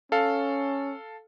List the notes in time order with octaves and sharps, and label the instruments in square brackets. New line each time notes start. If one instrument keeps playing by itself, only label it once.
[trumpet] C#4 [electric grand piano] A4 F5